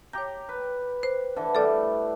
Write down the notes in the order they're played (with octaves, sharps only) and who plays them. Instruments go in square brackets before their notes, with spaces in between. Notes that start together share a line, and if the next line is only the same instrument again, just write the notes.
[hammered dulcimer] G4 G5 A#5 [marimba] C#5 G6
[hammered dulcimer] B4
[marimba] C5
[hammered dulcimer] D3 E3
[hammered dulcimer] E3 G3 A3 [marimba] A4 D5